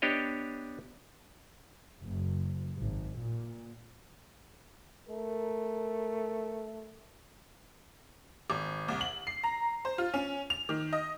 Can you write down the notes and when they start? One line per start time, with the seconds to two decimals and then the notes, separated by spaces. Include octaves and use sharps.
0.02 B3 D4 G4 C#5 D#5
2.01 F#1
2.77 G#1
3.18 A#2
5.09 A3 A#4
8.50 G#1
8.88 C2
9.01 F#7
9.27 C7
9.43 A#5
9.85 C5
9.98 F4
10.14 C#4
10.50 F7
10.69 D#3
10.93 D#5